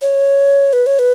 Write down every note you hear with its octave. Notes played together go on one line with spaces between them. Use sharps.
C#5
B4
C#5
B4